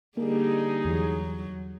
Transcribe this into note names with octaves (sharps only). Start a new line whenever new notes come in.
D3 G3 A#3 D#4 G#4
E2 E3 F#3